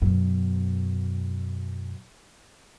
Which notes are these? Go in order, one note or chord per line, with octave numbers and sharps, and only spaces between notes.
F#2 B2